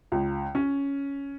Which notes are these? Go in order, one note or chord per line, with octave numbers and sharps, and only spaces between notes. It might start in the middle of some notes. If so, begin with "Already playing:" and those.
C#2
C#4